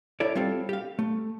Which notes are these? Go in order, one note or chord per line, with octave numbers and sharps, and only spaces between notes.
E4 A4 C#5 D5
G3 C4 F4 A4
G4 F5
A3